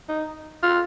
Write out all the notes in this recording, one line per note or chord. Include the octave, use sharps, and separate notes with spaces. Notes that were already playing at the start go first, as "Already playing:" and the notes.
D#4
F4